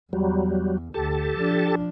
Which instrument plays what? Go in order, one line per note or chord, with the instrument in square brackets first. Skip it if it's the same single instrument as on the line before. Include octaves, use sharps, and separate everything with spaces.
[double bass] E2 [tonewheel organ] F#3 G3
[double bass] D2 [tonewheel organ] G4 A4 A5
[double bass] F3 D4